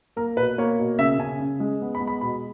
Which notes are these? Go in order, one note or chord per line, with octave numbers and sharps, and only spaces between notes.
A#3 A#4
B2 B4
A#3 C#5
B2
C#3 E5
C#3 G#5
C#3
G#3
B3
B5
G#3
B5
B2 B5